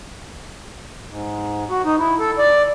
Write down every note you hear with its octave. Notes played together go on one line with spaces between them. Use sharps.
G#2
F#4
D#4
E4
A4
D5